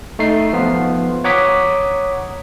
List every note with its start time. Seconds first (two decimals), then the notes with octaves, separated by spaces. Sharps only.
0.19 A3 D#4 C7
0.53 F3 B3 F4
1.24 C#5 F#5 A#5 D6 D#6 B6